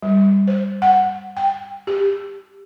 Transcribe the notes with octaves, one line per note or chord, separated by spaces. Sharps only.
G3
C5
F#5
G5
G4